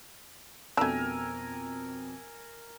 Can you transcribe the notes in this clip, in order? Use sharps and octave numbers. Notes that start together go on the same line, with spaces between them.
F2 B2 A3 D4 A#4 G#5 E6